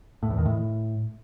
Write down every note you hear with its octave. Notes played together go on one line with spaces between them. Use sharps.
A2
E2
D#3
A2